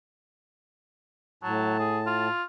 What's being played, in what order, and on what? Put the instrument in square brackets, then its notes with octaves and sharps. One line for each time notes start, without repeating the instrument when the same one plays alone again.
[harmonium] A2 A5 [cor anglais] F#3
[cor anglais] G#4
F4